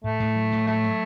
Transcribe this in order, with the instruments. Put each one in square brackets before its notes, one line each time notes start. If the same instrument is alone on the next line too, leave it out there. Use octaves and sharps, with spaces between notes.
[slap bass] A2 [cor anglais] A3
[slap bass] A2
F#3
A2
[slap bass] F#3 [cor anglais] A3
[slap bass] F#3